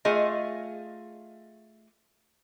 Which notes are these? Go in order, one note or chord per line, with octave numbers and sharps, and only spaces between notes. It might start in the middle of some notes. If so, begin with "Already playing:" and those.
A3 F4 G#4 D#5